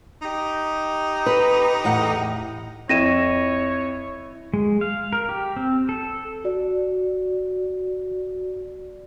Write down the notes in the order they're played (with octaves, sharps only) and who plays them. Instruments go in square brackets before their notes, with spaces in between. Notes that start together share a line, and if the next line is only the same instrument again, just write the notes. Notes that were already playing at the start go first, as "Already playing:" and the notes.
[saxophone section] D#4 G4 D#5
[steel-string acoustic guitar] B4
E2 A2 F#5
[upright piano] F2 [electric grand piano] E4 [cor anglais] C#5 [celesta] A#6 D#7 E7
[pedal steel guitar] G#3
F5
A#4
G4
C4
A4
[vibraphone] F#4 D5